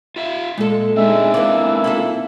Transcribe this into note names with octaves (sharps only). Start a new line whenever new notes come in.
F4 E5 F5
A#2 G#3 A4
G#3 C4 D4 D#4 E5
E3 A#3 D5
E4 F4 A4